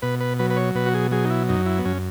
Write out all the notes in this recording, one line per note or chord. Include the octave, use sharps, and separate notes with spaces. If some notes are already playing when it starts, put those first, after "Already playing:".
B2 B4
B4
F#3 B4
B4
C#5
B2 B4
F#4
G#4
F#3 G#4
D#4
E4
F#2 D#4
E4
B3
F#2 C#4